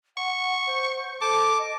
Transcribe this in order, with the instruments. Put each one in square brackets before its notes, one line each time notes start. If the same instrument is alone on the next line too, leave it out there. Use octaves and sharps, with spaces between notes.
[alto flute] F#5 [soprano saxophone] C#6
[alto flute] C5
[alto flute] A4 [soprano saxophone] A5 [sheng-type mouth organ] D6
[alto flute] D#5